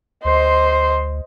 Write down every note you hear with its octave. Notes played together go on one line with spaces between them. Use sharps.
D2 C5 D#5 C6